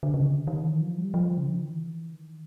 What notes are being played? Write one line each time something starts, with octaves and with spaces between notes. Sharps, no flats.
D3
C#3
D3
D#3
E3
F3
G3
F3
C#3
D3
D#3
E3
D#3